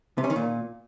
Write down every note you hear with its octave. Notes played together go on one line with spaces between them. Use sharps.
C3
C#4
D#3
A#2